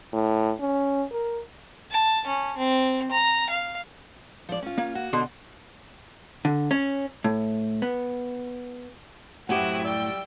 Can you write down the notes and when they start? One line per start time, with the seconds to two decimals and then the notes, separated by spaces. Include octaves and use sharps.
0.13 A2
0.60 C#4
1.12 A#4
1.91 A5
2.27 C#4
2.57 C4
3.11 A#5
3.50 F5
4.49 F3 D5
4.63 C#4 F4
4.78 A#3
4.95 F#4
5.13 B2 D3 C6
6.45 D3
6.71 C#4
7.24 A2
7.82 B3
9.49 F#2 A2 C4 E4 F#4 G4 F#5 D#6
9.85 G3 D5 G5 E6